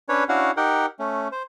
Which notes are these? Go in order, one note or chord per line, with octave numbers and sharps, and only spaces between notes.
C#4 D4 B4 C#5
C#4 D4 E4 F#4 F5 F#5
D#4 G4 A#4 F#5 G5
A3 C#4
C5